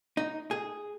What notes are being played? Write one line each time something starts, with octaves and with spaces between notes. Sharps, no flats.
D#4
G#4